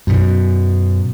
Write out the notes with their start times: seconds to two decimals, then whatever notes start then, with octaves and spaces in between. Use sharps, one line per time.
0.07 F#2 B2